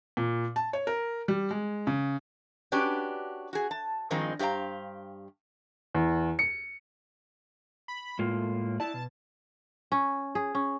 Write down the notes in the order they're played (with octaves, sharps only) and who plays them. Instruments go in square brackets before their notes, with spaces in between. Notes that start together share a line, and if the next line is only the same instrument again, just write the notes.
[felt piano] A#2
A5
C#5
A#4
G3
G#3
C#3
[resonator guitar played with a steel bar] C#4 D4 F#4 G4 B4 D5
F#4 G#4
A5
G2 D#3 F3 G#3 C4 D#4
G2 G4 C5 F5 A#5
[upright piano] E2
C#7
[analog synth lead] B5
[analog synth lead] A2 [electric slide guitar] G#3 A#3 F4
[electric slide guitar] E4 D5 [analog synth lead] A5
[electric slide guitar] B2
[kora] C#4
G#4
C#4